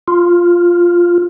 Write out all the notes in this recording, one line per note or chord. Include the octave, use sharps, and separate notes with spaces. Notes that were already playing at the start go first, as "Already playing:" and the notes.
F4